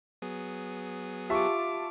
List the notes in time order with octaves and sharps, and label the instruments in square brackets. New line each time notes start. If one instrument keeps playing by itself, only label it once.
[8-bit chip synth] F#3 B3 G#4
[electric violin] F4 D6 [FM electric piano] G4 A5 [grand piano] E5 C#6